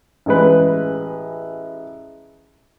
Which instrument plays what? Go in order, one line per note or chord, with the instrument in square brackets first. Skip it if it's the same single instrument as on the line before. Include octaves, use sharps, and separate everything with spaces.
[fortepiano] A1 G#3 B4